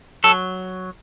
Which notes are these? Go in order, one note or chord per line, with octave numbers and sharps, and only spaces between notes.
F#3 A4